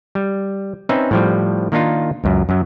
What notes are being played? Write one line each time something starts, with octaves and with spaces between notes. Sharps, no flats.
G3
C4 C#4 D#4 B4 E5
A2 F3 G3
D#3 A#3 D4 D#4 F4
C#2 F#2
F#2 F#3